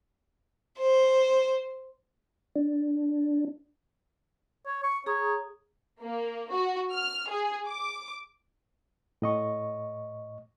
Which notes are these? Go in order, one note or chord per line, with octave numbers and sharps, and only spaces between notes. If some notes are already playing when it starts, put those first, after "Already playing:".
C5
D4
C#5
C#6
G#4 C#5 A#5 D#6
A#3
F#4
F6
G#4
D6
A2 D#5 C#6